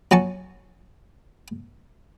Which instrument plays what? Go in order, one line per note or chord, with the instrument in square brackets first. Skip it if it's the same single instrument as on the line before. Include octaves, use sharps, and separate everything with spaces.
[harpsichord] F#3 G#5 A5 C#6